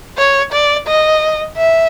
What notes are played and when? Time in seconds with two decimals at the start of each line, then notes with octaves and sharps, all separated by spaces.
0.18 C#5
0.52 D5
0.87 D#5
1.57 E5